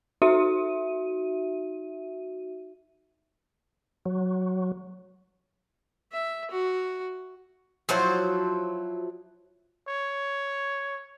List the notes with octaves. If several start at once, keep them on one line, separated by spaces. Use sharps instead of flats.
D#4 F#4 E5 D#7
F#3
E5
F#4
F3 F#3 E4 C5
C#5